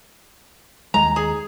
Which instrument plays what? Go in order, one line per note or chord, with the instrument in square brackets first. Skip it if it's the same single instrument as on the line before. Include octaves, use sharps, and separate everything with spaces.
[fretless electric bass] D#2 G#3 [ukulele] A#5
[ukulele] G#4